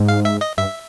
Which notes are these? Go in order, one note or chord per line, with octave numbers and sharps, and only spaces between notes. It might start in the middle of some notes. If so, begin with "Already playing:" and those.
Already playing: G#2
F5
E5
D#5
G2 E5